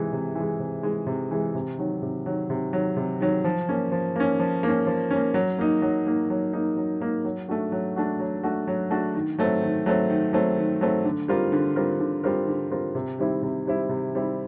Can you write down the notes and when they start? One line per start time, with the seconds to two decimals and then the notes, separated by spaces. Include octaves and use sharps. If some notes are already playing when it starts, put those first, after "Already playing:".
Already playing: C3 E3 G#3
0.13 C3
0.35 E3 G#3
0.60 C3
0.83 E3 G#3
1.07 C3
1.31 E3 G#3
1.55 C3
1.78 D#3 F#3
2.02 C3
2.26 D#3 F#3
2.50 C3
2.73 D#3 F#3
2.97 C3
3.20 D#3 F#3
3.44 F3
3.69 A#3 C#4
3.92 F3
4.16 A#3 C#4
4.40 F3
4.63 A#3 C#4
4.87 F3
5.11 A#3 C#4
5.34 F#3
5.58 A#3 D#4
5.82 F#3
6.07 A#3 D#4
6.30 F#3
6.53 A#3 D#4
6.77 F#3
7.00 A#3 D#4
7.24 F#3
7.48 A3 D4 F#4
7.72 F#3
7.96 A3 D4 F#4
8.19 F#3
8.43 A3 D4 F#4
8.68 F#3
8.90 A3 D4 F#4
9.15 D#3
9.38 F#3 A3 C4
9.62 D#3
9.86 F#3 A3 C4
10.10 D#3
10.33 F#3 A3 C4
10.57 D#3
10.81 F#3 A3 C4
11.04 D3
11.28 G3 C4 F4 A#4
11.52 D3
11.76 G3 C4 F4 A#4
11.99 D3
12.24 G3 C4 F4 A#4
12.48 D3
12.71 G3 C4 F4 A#4
12.95 C3
13.18 D#3 G3 C4 E4
13.43 C3
13.65 D#3 G3 C4 E4
13.89 C3
14.13 D#3 G3 C4 E4